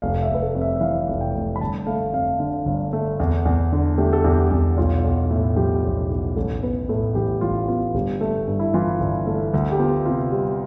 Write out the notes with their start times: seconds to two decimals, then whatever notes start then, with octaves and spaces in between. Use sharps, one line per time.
0.02 F1 F5
0.22 E5
0.28 F1
0.34 B4
0.42 A4
0.55 F2
0.61 E5
0.76 E5
0.81 E3 F5
1.08 F1
1.21 G5
1.35 F1
1.56 B5
1.61 G1 A5
1.86 A3 F5
2.13 F2 F5
2.39 D3 F5
2.66 G1
2.93 A3
3.20 E2
3.45 E2
3.72 D3
3.98 A3 G4
4.13 A4
4.24 E2 G4
4.51 E2
4.77 B1 F4
5.04 B1
5.30 A2
5.56 F3 G4
5.84 B1
6.10 B1
6.36 A1 A4
6.62 B3 B4
6.89 A2 A4
7.15 E3 G4
7.41 A1 F4
7.68 B3 F4
7.94 G1 G4
8.21 A3
8.47 G2
8.59 E4
8.74 E3 F4
9.00 G1
9.27 A3
9.54 D2
9.72 G4
9.79 B3 F4
10.05 C3 F4
10.32 G3